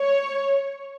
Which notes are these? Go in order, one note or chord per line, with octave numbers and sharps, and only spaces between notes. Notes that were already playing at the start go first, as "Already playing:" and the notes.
Already playing: C#5